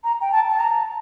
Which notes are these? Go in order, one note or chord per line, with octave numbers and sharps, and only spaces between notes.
A#5
G5
A5
A5
A#5